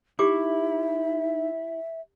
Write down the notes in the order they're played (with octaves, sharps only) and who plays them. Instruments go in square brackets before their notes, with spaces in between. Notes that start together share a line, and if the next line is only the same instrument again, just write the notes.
[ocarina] D#4 [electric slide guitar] E4 [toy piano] G4 D6 [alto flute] E5